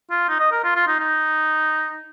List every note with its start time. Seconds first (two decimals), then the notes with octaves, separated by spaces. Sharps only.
0.11 F4
0.29 D#4
0.40 D#5
0.52 A#4
0.64 F4
0.75 F4
0.87 D#4
0.99 D#4